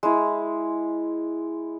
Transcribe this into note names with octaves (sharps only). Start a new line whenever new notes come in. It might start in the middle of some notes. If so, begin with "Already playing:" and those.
G#3 E4